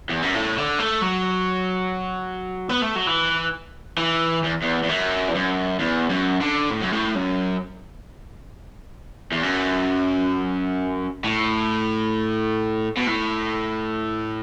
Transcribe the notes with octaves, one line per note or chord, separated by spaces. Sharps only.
E2
F#2
A2
D3
A3
F#3
B3
A3
F#3
E3
E3
E2
E2
E2
F#2
E2
F#2
E2
F#2
D3
A2
F#2
A2
F#2
E2
F#2
A2
B2
A2